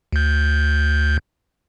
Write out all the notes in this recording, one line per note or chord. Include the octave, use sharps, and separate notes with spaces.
D2 G6